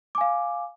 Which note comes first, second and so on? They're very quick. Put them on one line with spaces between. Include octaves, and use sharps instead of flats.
D6 G#5 F5